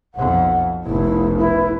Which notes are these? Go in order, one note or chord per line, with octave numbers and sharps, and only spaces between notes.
B1 F2 F#5
F1 B1 E4
E4 B4